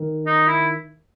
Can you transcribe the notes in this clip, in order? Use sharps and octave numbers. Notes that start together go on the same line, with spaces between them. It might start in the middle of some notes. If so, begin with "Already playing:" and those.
Already playing: D#3
D#4
E4